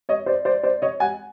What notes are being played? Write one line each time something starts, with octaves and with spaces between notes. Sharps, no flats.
C#5 D#5
C5 D5
C5 D5
C5 D5
C#5 D#5
F#5 G#5